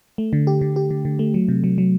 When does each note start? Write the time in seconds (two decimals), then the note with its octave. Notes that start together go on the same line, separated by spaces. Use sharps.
0.18 A3
0.33 D3
0.47 G4
0.61 D3
0.76 G4
0.91 D3
1.05 D3
1.19 A3
1.34 F#3
1.48 C3
1.64 F#3
1.78 F#3